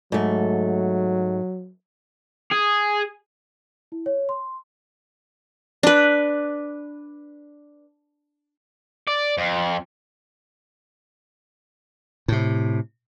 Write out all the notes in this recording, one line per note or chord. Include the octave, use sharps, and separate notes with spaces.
G#2 F#3 A3
G#4
E4
C#5
C6
D4 B4
D5
F2
A2 C3